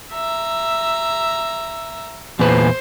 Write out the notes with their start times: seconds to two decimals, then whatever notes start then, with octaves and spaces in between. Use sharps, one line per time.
0.12 E5 A#5
2.39 E2 A#2 B4 C5